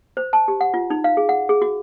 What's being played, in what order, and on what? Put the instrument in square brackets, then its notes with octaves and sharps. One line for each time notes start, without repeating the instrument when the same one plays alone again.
[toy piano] C5
A5
G4
F#5
F4
D#4
F5
G#4
F#5
G#4
F#4